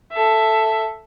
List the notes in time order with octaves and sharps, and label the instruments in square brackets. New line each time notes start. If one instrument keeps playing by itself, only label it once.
[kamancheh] A4 E5